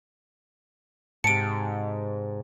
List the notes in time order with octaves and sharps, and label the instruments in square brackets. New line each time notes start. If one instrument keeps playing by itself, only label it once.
[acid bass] G#2 [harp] C3 A5 [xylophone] C#7 D7